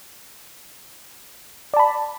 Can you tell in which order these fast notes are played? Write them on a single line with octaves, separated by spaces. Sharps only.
D5 A5 B5